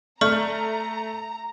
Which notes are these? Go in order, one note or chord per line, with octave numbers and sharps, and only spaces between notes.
A3 D5 A#5 C#6 F6